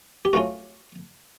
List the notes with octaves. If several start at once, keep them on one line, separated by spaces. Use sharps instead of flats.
G4
A2 F#3 A3 C#4 F4 F#4